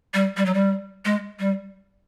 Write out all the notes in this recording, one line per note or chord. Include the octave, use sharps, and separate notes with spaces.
G3
G3
F#3
G3
G#3
G3